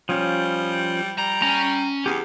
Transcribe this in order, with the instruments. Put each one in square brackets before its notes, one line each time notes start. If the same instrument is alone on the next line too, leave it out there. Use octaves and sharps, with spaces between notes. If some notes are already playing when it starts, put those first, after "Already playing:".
[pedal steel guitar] F3 C#4 [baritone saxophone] G3
[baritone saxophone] G3 [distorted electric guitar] A#5
[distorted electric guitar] C#4 [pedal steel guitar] A#5
[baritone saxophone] E2 [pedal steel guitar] G4 G#4